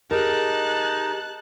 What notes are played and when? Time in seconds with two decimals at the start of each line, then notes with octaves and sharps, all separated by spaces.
0.11 D#4 G4 G#4 A#4 A5 F#6